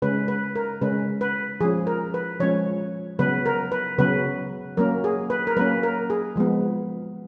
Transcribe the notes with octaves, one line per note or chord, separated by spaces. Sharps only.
C#3 G#3 C#4 B4
B4
A#4
C#3 G#3 C#4 B4
B4
F3 G#3 C#4 G#4
A#4
B4
F3 G#3 C#4 C#5
C#3 F#3 B3 B4
A#4
B4
C#3 F#3 B3 B4
F#3 A#3 C#4 A#4
G#4
B4
A#4
F#3 A#3 C#4 B4
A#4
G#4
F3 G#3 B3